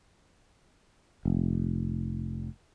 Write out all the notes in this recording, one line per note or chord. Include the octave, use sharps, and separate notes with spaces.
F1